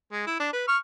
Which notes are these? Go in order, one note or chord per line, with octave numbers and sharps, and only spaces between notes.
G#3
E4
D4
B4
C#6 F6